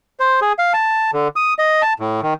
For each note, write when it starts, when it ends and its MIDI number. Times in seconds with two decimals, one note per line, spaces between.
0.20 0.40 72
0.41 0.53 68
0.59 0.73 77
0.74 1.11 81
1.13 1.28 50
1.36 1.54 87
1.59 1.82 75
1.82 1.93 81
2.00 2.21 45
2.23 2.34 51